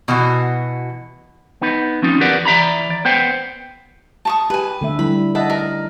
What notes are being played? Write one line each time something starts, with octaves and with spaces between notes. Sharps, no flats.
B2 E3 F#4
B3 D#4 B4
F3 C4 C#4 D#4 F4
E2 G4 A#4 B4 D5 F#5
E3 D5 E5 A#5 B5
D5
B3 C5 G5
A5 C#6 D#6
G4 B4 G#5
D3 A3 E5
G3 E4 B5
D#5 E5 F#5 A5
A#4